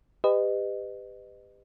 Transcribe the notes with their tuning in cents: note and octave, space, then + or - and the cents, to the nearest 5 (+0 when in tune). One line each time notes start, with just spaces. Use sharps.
G4 +25 B4 +30 D#5 -20